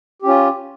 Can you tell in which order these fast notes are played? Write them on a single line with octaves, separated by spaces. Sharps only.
G4 C#4 F4